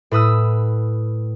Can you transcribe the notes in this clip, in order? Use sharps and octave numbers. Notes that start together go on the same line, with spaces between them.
A2 B4 D#6 E6